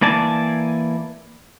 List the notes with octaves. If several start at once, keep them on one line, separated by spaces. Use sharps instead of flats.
E3 A#3 D5 G#5 A5